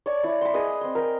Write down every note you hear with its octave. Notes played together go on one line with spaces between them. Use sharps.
C#5 D5 A5
E4 D5
B5 C6
G#4 B4 D#5
C4 C6
A#4 G5